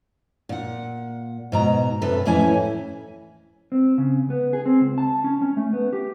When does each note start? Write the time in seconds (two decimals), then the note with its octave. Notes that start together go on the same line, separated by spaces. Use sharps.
0.49 A#2 F#5
1.52 G#2 B2 A#5
2.01 F#2 C3 A4 B4
2.26 F2 A2 E3 C#4 E4 G#5
3.72 C4
3.98 C#3
4.30 B3
4.53 G#4
4.66 C4
4.81 C#2
4.98 A5
5.24 C#4
5.42 C#4
5.57 A3
5.73 B3
5.93 G4